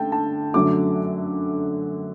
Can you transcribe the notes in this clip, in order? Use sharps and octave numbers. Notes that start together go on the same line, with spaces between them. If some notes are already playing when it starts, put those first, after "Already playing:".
Already playing: D3 A3 G5 A5
A5
F#2 D3 F#3 A3 D6